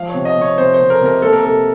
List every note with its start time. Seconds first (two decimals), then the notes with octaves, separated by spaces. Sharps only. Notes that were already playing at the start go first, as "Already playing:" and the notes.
Already playing: F3 F5
0.09 C#5
0.14 C3
0.25 D#5
0.37 C3 C#5
0.58 C3 C5
0.74 C5
0.80 C3
0.90 A#4
1.01 C3 A#4
1.22 A#3 A4
1.33 A#4
1.43 C3 A4